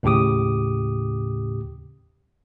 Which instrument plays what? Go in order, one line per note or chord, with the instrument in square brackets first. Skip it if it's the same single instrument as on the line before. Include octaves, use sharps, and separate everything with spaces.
[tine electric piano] D#2 A2 C#3 G4 D6 D#6